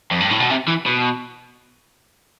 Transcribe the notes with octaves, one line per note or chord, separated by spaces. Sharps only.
F2
G2
A2
B2
C3
E3
B2